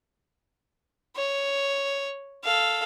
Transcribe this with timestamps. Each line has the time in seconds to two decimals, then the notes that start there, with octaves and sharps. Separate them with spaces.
1.16 C#5
2.44 A4 F5